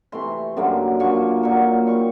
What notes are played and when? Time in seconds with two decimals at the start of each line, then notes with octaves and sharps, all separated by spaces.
0.12 C3 E3 A3 C6
0.57 F#2 D3 G3 A#3
1.00 G2 D3 F3 A#3 C#6
1.43 A#2 F#3 A#3 C#6
1.87 D#3 G3 C#6